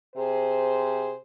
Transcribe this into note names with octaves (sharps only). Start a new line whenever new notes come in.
C3 G#4 C5